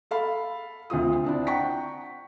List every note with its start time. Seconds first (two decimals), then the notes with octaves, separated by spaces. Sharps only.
0.11 A4 F5 B5
0.90 D2 C4 F4 D#6
1.24 C4 D4 E4
1.47 F#5 G5 A#5 C#6 B6